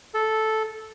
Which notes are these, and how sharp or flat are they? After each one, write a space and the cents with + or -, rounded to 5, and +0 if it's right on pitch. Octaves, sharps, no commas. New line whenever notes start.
A4 -5